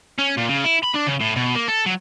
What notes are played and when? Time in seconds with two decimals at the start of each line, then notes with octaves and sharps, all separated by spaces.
0.19 C#4
0.37 A#2
0.49 C#3
0.65 E4
0.84 B5
0.95 D4
1.08 C#3
1.21 A2
1.37 B2
1.55 A#3
1.68 A4
1.86 F#3